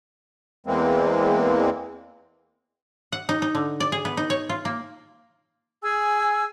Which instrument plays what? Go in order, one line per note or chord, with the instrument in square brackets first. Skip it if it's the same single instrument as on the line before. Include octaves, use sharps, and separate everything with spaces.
[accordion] E2 E3 G#3 A#3 C4
[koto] F#5
D#4
D#4
D3
D5
G#4
B3
D#4
C#5
F4
A#3
[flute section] G#4 G#5 E6